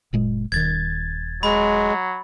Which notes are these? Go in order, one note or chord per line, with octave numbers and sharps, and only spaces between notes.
F#1 A#2 G#3
D#1 D#3 G#6 A6
F#3 G#3 B5